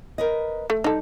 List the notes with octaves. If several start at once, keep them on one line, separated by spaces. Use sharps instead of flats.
A#4 B4 D#5
A3
G3 D#4 A4